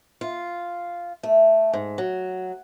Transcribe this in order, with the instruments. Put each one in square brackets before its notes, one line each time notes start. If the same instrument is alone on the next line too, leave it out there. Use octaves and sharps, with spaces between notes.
[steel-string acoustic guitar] F4
A3
G#2
F#3